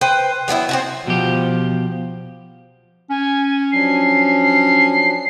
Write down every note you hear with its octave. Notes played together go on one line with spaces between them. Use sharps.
B4 C5 G5
F#3 B3 D4 E4
C4 C#4 F#4
B2 F3 G4
C#4 G#5
F3 F#3 D4 C7
C7